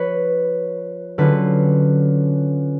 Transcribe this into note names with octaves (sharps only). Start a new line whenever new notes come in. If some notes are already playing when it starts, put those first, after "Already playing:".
Already playing: F3 B4 C#5
D3 F#3 C#4 F4 B4